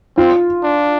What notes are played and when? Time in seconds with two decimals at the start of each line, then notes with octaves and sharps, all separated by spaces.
0.17 C4 F4
0.64 D4